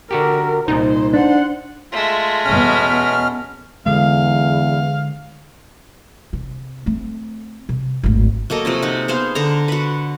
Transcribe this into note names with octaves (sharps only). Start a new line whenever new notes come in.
D3 F#4 G4 A#4
C2 A#2 D#4 C5
D4 C5 F#5
G#3 A3 F4
E2 B2 B3 C#4 F6
E2 D3 G#3 F5
C3
A3 C4
C3
D1 G#1
F#3 A#3 A4 D#5
C3 F3 C#4
D#4 F#5
B3 G#4 C5 F5
D3 A4 A#5
F#4 B4